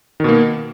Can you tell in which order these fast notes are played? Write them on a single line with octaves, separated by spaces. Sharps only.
D#3 B2 A#3